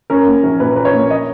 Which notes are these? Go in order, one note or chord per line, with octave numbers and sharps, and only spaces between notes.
C#4 A#4
A#3
A#1
A#2 B4
C#4 B4
C#5
A#3
D#5